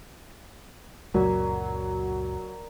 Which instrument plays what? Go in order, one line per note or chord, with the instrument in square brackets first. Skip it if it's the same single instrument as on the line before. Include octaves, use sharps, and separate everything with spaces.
[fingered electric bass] C#2 F#2 A#2 [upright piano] F#3 [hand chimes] A#4 D5 A#5